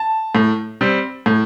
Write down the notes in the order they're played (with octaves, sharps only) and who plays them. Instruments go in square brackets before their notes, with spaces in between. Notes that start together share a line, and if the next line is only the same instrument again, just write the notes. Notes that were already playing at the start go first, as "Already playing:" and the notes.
Already playing: [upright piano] A5
A2
G3 C4
A2